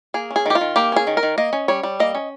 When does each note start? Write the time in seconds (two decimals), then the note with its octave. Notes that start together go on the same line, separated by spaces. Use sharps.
0.14 A#3 G#4
0.31 C#4
0.36 G#4
0.46 D#3 G4
0.55 F4
0.61 D#3
0.76 A#3 G4
0.92 C#4 G#4
1.07 D#3
1.17 A#4
1.23 D#3
1.38 A#3 D#5
1.53 C#4
1.68 G3 C#5
1.83 G3
2.00 A#3 D#5
2.15 C#4